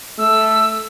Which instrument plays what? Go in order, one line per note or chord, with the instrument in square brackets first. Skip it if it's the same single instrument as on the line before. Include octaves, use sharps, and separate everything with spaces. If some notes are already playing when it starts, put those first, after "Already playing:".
[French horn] A3 [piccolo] E6